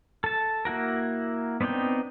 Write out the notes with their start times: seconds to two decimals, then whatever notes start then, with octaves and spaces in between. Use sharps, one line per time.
0.24 A4 A5
0.65 A#3 E4 F#4 A#4
1.61 B3 C4 D4 D#4 G5